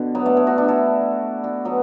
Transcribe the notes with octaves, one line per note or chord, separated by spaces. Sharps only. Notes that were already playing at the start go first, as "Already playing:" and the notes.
Already playing: B2 D3
F#3 B3
A3 D4
B3 E4
D4 F#4
D4 F#4
E4 A4
D4 F#4
F#3 B3